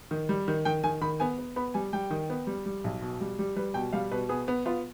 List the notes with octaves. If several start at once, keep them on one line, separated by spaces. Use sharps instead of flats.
D#3
G3
D#3
D#3 G5
D#3 G#5
D#3 B5
B3 G#5
B3
B3 B5
G3 G#5
G3 G5
D#3
B3
G3
G3
B1
B2
G3
G3
G3 B4
B2 G5
G3 F5
B2 B4
B3 G#4
B3
B3 F4